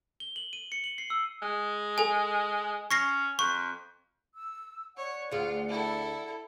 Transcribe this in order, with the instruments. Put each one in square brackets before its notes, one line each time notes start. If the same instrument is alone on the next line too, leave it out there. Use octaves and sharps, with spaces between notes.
[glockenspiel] G7
F#7
D#7
C#7
F#7
C7
E6
[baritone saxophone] G#3
[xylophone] A4 G#5
[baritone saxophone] C#4 [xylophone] C#6 A#6 C7
[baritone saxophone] F2 [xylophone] C#6
[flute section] E6
[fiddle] C#5 [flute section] D5 F#5
[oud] D2 G#4 [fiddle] F4
[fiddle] E4 A4